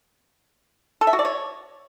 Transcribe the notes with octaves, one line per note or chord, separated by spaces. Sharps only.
A4
E5
F#4
D5
C#5